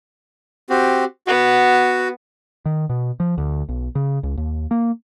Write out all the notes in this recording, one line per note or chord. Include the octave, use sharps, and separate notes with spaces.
C4 F#4 G4
B3 F#4
D#3
B2
F3
D2
B1
C#3
C#2
D#2
A#3